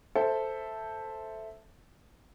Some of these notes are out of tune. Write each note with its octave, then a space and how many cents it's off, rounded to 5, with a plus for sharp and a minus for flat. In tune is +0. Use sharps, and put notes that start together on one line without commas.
A4 +0 C5 +0 E5 +0